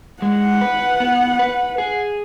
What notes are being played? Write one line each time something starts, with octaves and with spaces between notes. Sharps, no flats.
G#3 F#5
B4
B3
B4
G#4